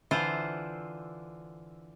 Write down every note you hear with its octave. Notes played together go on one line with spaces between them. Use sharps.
D3 E3 F4 C5